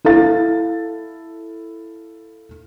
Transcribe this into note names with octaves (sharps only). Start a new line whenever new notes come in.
E4 A4 F5 A6